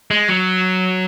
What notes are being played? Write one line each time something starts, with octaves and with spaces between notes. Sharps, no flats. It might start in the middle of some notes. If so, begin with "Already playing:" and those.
G#3
F#3